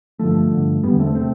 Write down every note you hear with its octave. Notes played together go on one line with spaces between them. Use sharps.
G2 D3 F3 A3
G2 D3
E2 D3 G3 B3
A3 C4
C3 A3 C4